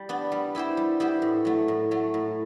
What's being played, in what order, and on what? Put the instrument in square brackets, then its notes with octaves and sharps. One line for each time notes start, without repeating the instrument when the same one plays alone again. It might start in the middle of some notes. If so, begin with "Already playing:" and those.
Already playing: [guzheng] G3
B3 D4
G3
B3 E4 G4 C5
G3
B3 E4 G4 C5
A2
F#3 A3
A2
F#3 A3
A2